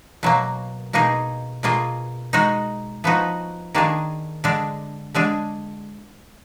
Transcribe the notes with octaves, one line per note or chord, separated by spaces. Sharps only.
B2 F#3 A#3
B2 A#3 D#4 G#4
B2 A#3 F4 G#4
G#3 D#4 F#4
F3 B3 D#4 F#4
D#3 A#3 D4 G#4
D3 G#3 D4
D3 G#3 D4 G#4